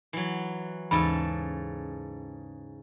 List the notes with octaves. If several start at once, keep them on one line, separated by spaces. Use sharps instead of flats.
E3 F#3
D#2 G#2 C#3 E3 A4 B5